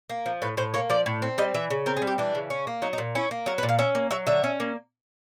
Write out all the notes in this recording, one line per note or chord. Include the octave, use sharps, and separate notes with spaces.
A#3
F3
A2 B4
A2 C5
A#3 C#5
F3 D5
A2
C4
G3 D#5
E3 E5
C#3
C4 A#4
G#4
G3
G4
E3 D4
C#3
C#4
A#3
F#3 D#4
D#4
A#2
C#4 E4
A#3
F#3 A#4
B4
A#2
F5
C#4 E5
A#3
F#3 E5
D3 E5
C#4
A#3